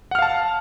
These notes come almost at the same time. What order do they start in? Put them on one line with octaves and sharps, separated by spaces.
F#5 F6 F5 A5